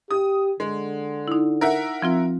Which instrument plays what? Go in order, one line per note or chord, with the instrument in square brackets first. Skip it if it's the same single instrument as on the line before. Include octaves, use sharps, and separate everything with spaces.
[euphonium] G4 [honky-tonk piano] D#6
[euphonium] D3 [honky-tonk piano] G#3
[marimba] D#4 E4
[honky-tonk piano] A#4 E5 F#5
[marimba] F3 C4 F4